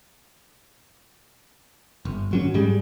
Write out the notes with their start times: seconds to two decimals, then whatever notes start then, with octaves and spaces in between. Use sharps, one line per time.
2.05 G1
2.31 G#1 F#3 C#4
2.54 G#2 G3 G#3